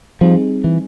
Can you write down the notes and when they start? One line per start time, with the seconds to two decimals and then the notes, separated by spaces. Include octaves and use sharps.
0.21 F3 G3 C4 D#4 G#4
0.64 E3